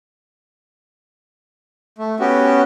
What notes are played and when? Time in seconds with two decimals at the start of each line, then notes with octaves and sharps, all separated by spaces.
1.98 A3
2.20 B3 C#4 F#4 G4